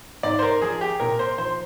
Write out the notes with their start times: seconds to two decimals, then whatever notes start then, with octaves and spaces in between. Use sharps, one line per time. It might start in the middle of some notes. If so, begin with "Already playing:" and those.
0.23 G#2 D5
0.39 C5
0.42 A#4
0.62 F3 G#4
0.81 G4
1.00 A#2 A#4
1.19 C5
1.38 F3 C5